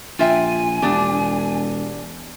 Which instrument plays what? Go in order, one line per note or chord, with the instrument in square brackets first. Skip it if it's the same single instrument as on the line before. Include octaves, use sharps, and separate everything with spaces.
[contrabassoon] A#1 [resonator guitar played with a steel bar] F4 E5 G5 [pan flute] G#5
[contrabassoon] E1 [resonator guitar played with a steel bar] B3 D4 G4